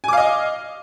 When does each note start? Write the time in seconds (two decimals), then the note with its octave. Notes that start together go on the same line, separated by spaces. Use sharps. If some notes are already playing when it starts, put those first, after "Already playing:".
0.04 G#5
0.08 D6
0.13 F5
0.17 D#5